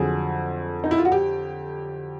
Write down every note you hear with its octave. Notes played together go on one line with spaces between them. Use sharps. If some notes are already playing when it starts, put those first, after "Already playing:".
Already playing: F2 D3 F#3 G#4
D#4
E4
F4
F#4
G4